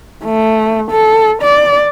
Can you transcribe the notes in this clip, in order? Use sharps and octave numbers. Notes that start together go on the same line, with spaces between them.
A3
A4
D5